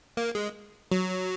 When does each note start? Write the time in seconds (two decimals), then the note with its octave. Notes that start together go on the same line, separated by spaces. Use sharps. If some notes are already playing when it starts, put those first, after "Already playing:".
0.17 A#3
0.35 G#3
0.92 F#3